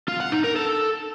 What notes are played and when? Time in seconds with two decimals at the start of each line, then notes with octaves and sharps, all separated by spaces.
0.08 F4
0.20 F#5
0.32 D#4
0.44 A#4
0.56 A4